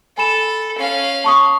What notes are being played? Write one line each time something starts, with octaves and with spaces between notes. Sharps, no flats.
A4 G#5 B5 E7
C#4 F5
A5 C#6 D#6